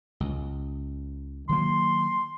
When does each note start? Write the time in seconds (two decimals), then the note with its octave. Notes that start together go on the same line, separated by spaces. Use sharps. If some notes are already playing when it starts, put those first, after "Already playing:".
0.20 C#2
1.49 D#3 F#3 A#3 C6